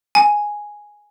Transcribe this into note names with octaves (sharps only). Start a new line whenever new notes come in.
G#5